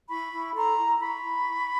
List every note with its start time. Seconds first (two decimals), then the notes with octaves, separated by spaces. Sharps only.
0.09 E4 B5 C#6
0.32 E4
0.55 A4 A#5 C6
0.78 E4
1.00 E4 B5 C#6
1.23 E4
1.46 E4